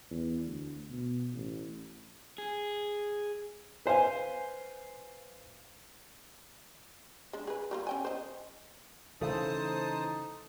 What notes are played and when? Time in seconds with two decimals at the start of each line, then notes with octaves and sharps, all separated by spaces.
0.10 E2
0.46 D2
0.90 B2
1.33 A1
2.38 G#4
3.86 B4 C5 F5 G#5
7.33 G#3 D4
7.47 G#4 B4
7.71 G3 A#3 F4
7.87 C#4 G5 G#5
8.05 C5 D#5
9.21 C#3 E3 A3 D#4 C5 A5 D#6